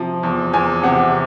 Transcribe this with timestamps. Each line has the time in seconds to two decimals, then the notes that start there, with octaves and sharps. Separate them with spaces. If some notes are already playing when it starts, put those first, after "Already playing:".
Already playing: C3 F3
0.23 E2
0.53 E2 G#5
0.83 C3 F#5